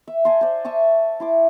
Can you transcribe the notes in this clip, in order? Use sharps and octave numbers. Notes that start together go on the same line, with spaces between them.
E5
G#5 A5 C6
C5 D5
E5 A5 C#6 D#6
E4 C6 D6